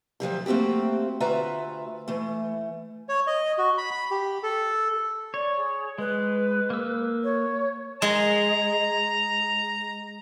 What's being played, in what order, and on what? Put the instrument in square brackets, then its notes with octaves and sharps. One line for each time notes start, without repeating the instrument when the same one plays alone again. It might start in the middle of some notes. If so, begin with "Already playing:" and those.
[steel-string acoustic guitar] D2 F3 F#3 G4
A3 A#3 C4 F#4 G4
D2 F4 F#4 B4 E5 A#5
E3 A3
[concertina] C#5
D#5
F#4
B5
B5
G4
A4
[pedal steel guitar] C#5 [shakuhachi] D5
[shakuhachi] G#4
[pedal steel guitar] G#3 [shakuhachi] B4
[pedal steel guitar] A#3 E6
[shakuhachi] C#5
[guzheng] G#3 [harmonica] A#5